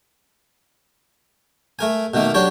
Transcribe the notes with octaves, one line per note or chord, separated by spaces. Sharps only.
A3 A#4 G#5
B2 D#3 A3 A#3
F#3 D4 G4 C#5